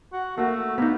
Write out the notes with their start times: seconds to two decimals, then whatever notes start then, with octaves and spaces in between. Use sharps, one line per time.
0.13 F#4
0.38 A3 A#3 F#4
0.78 A#3 B3 D#4